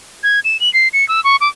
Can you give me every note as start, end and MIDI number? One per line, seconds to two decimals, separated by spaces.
0.23 0.40 92
0.45 0.60 100
0.60 0.72 102
0.74 0.88 96
0.93 1.07 97
1.09 1.23 88
1.24 1.36 85
1.41 1.48 86